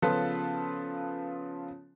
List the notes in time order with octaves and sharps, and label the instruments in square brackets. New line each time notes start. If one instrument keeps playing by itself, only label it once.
[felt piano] C#3 F3 B3 F4 A4 B4